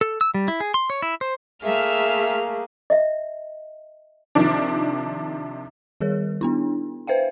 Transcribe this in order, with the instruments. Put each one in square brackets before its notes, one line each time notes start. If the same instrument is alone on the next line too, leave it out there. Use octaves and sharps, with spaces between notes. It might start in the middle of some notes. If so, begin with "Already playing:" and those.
[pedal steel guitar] A4
E6
G3
E4
G#4
C6
C#5
E4
C5
[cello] A3 G#4 [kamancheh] A#3 [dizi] E5 [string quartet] F6
[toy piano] D#5 E5
[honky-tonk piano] C3 D#3 F3 D4
[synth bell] D#3 G3 G#4 A#4 C#5
B3 D4 E4
B4 C5 E5 F5 G5